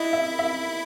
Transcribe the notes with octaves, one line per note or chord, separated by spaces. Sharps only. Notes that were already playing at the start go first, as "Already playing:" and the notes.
Already playing: E4 D#5
E5
E5